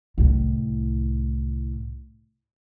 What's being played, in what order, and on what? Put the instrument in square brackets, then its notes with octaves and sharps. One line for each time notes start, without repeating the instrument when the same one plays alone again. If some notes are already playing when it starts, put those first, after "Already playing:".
[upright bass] C2 A2